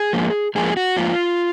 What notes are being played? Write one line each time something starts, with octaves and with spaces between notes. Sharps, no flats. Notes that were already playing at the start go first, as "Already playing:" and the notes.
Already playing: G#4
G#2 F3 A#3
G#2 F3 A#3 G#4
F#4
G#2 F3 A#3 F4